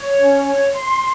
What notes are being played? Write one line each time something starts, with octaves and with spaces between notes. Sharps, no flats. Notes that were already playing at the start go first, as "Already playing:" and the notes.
Already playing: C#5
C#4
C#5
C6